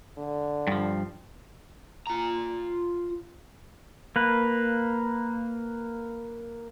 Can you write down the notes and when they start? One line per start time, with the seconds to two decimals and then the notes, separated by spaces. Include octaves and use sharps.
0.18 D3
0.67 G2 F3
2.07 F4 A#5
4.16 A#3 B4